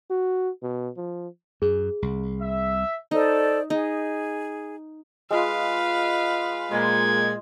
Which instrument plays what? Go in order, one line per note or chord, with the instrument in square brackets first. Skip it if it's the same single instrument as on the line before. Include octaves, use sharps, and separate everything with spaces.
[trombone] F#4
B2
F3
[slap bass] F#2 [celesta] G#4
[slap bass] C2
[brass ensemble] E5
[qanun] D#4 [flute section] A4 C5 D5
[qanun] D#4 [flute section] G#4
[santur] G#3 F4 [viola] B4 F5
[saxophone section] A#2 G#3 [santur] C5 [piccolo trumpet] G#6